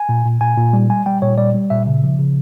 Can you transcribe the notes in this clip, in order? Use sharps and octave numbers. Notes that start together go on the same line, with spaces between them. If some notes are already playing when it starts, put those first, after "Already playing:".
Already playing: G#5
A#2
A#2
A#2 G#5
A#2
G3
G3 G#5
G3 G5
A#2 C#5
G3 D5
G3
A#2 E5
C#3
F3
C#3